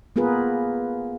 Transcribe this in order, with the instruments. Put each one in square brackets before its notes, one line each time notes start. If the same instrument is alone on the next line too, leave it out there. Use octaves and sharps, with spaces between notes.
[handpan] A#3 B3 F4 G#4 A#4 B4